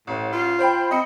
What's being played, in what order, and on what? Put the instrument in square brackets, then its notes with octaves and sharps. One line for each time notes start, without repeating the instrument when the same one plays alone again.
[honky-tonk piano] A1 [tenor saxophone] A2
[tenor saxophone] F4
[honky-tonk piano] C5 G5 B5
[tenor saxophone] C4 [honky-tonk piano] D#5 B5 C#7